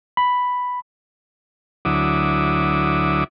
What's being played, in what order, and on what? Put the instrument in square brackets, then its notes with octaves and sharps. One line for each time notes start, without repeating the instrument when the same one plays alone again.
[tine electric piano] B5
[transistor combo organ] D2 F#3 E4 D6 D#6